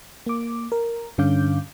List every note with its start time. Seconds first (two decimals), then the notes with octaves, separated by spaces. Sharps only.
0.26 A#3 D6
0.72 A#4
1.18 G2 D3 C#4 F5 D6 G6